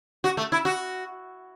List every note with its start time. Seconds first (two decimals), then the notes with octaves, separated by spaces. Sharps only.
0.24 F#4
0.37 A3
0.52 E4
0.65 F#4